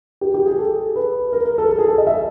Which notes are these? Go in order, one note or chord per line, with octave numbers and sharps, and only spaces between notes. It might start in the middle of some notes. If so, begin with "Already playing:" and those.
G4
G4
G#4
A4
B4
A#4
A#4
A4
A4
G#4
A4
D#5
E5